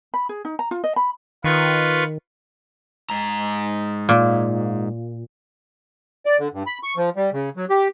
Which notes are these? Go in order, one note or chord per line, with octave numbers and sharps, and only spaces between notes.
B5
G#4
D#4
A#5
F4
D#5
B5
D#3 F4 B4 C#6
G#2 A#5
A#2
D5
D3
G2
B5
C#6
F3
G3
C#3
F#3
G4